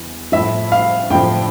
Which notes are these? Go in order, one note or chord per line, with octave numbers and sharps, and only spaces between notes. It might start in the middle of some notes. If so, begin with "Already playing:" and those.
Already playing: E2 E3
A2 F3 E5
F5
A2 F3 G5